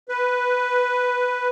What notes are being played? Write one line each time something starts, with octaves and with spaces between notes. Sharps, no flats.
B4